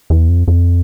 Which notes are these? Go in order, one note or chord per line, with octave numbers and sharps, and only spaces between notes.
E2
F2
F2